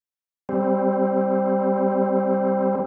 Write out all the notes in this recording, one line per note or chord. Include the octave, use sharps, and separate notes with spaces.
G3 C4